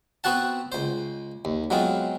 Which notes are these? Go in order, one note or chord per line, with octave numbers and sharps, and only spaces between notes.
B3 C4 F#4 F#5 A5
C#2 C5
D#2
F#3 G#3 B3 C4 F4